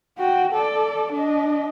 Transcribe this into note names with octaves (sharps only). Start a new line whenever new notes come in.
F#4 G5
A4 D5
D4 D#5